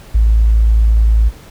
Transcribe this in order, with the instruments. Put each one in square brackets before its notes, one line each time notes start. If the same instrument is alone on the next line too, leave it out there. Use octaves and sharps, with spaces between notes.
[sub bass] A1